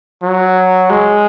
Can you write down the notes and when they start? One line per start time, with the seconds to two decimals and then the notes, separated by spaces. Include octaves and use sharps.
0.23 F#3
0.90 G#3